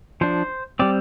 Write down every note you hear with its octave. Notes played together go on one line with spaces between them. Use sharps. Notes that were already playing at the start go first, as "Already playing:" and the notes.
F3 D4 C5
G3 C4 D5